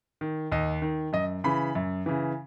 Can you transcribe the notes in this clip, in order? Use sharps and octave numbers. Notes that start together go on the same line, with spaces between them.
D#3
D#2 D#5
D#3
F#2 D#5
C#3 E3 B5
F#2
C#3 E3